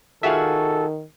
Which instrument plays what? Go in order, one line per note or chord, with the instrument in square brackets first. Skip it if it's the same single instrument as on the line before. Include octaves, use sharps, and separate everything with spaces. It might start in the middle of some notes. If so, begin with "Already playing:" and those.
[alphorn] D#3 [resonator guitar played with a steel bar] F4 F#4 G#4 [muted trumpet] A4 [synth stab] E5 F5